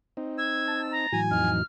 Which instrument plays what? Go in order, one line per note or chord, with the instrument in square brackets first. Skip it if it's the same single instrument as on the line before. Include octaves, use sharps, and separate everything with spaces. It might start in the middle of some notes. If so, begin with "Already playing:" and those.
[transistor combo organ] C4 D#4
[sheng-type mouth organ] E6 [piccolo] G#6
[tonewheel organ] A5
[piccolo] A#5
[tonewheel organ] A2 E3 F#3 [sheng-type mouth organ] G#5
[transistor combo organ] F2 D#4 [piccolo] F6